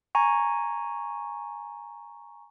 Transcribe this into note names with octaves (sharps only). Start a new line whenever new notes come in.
G#5 A#5 C#6